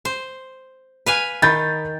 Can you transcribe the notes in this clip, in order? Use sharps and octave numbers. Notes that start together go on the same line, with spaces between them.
C5
B4 F5 G#5
D#3 B5 G6 A6